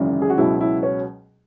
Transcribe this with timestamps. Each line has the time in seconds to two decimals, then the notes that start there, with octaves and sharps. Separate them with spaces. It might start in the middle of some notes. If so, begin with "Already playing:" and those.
Already playing: G#1 F#2 C#3 E3
0.22 G#4
0.30 F#4
0.38 C#2 B2 F#3 E4
0.61 E4
0.83 C#4